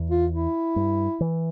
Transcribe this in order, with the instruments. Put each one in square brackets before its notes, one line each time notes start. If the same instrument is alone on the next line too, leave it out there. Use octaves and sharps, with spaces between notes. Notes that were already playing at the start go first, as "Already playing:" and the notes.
Already playing: [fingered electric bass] E2
[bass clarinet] F4
E4
[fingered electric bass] G2
E3